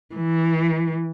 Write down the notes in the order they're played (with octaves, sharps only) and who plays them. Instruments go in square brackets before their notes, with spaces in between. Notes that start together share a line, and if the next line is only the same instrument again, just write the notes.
[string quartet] E3